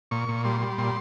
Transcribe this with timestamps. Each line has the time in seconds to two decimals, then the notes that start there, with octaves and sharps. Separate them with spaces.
0.11 A#2 C#6
0.29 A#2
0.44 G3 C6
0.61 G3
0.78 A#2 C6